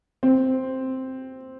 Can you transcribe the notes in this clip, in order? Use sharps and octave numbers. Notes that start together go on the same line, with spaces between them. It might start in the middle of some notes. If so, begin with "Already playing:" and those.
C4